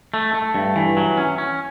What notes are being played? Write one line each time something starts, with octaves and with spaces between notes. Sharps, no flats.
A3
A3
G2
E3
F#3
C#4
C#4